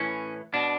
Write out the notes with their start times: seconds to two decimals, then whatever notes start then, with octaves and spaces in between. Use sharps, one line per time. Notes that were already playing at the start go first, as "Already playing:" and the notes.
Already playing: A2 E3 C#4
0.54 B2 D4